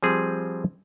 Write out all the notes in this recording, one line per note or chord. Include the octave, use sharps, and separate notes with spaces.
F3 G3 C4 G#4